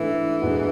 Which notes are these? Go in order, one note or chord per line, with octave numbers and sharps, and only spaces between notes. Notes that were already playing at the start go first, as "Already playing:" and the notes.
Already playing: G#2 E3 A3 D4
G#2 G#3 B3 D4 F#4